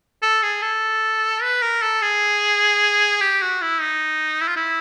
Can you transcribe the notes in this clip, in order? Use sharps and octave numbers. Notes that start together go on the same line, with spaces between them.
A4
G#4
A4
B4
A#4
A4
G#4
G4
F#4
E4
D#4
E4
F4
E4